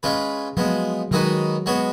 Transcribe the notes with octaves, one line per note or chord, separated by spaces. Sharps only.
G#3 C#4 F4 B4
F3 F#3 G#3 B3
D#3 F#3 G#3 D#4 F#4 B4
G#3 B3 F#4 C#5